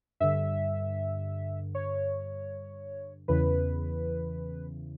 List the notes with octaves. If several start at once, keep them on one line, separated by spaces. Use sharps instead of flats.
G2 D3 E5
C#5
E2 C#3 E3 B4